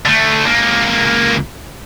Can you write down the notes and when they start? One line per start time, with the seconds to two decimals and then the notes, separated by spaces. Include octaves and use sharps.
0.06 D3 A3
0.46 C#2 A#3